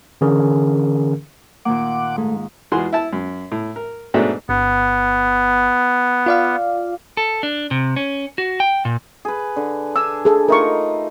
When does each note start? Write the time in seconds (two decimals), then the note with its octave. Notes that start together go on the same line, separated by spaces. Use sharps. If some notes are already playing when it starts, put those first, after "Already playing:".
0.21 D3 E3 C#4 G#4 A#4
1.65 A#2 D#3 A#3 F#5 D6
2.18 G#2 A3
2.72 E2 G#3 F4 F#4 G#4 C6
2.93 E4 A5
3.13 F#2
3.52 A2
3.76 A#4
4.14 G#2 B2 F#3 A3 B3 D4
4.49 G1 B3
6.26 F4 D5 F5
7.17 A4
7.43 D4
7.71 C3
7.96 C#4
8.38 F#4
8.60 G5
8.85 A#2
9.25 G#4 B4
9.56 D3
9.96 D4 G#5 E6
10.25 G#4 A4
10.48 A3 D#4 F4 A#4 C#6